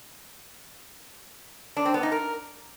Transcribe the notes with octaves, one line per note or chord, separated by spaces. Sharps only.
D4
C4
B3
D#4
A#4